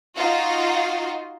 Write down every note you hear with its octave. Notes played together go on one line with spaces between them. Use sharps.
D#4 F4 F#4